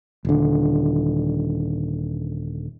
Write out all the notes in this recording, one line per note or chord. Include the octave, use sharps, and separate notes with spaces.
D#1 D3